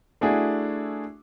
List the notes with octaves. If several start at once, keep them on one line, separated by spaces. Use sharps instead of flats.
A3 D4 E4 F#4 G#4